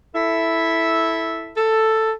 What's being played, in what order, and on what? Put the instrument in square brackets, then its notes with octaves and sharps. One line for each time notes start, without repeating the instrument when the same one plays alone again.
[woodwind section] E4 A4 E5
[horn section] A4